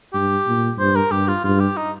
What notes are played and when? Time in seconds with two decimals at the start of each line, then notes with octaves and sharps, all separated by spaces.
0.14 G2 G4
0.47 A#2
0.78 G2 C5
0.95 A#4
1.12 G2 G4
1.27 F4
1.44 G2 F4
1.60 G4
1.77 D#4